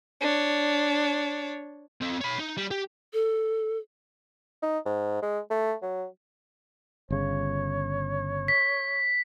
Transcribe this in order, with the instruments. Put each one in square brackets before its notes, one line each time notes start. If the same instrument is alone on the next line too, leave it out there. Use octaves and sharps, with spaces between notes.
[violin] D4 C#5
[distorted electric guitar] C4 A4
C#5 B5
D#4
G3
G4
[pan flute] A4
[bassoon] D#4
G#2
G#3
A3
F#3
[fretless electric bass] G1 C#3 [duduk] C#5
[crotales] B6